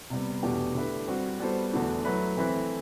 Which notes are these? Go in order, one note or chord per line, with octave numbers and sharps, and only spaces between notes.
C3 G3 B3
E2 B2 A3 D4 G4
D3 A3 E4 G4 B4
G3 C4 F#4 C5
G3 B3 F#4 A4 C5
E2 D3 A3 D4 F#4
F#3 A3 E4 B4
E3 A3 C4 E4 B4